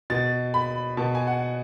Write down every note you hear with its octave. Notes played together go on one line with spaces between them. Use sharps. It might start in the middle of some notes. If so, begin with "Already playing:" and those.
B2 A6
B5
B2 A5
G#5
F#5